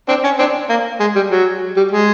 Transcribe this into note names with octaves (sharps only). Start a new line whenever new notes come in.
C4 D4
C#4
C4 D4
A#3
G#3
G3
F#3
G3
G#3